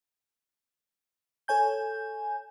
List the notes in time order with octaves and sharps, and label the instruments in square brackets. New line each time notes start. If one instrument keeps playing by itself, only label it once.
[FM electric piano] A4 C#5 G#5 G6